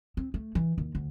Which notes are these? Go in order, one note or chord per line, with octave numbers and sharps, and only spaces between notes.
C4
A3
E3
D#2
D2